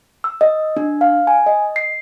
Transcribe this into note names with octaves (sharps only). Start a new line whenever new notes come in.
E6
D#5
D4
F5
G#5
D#5
C7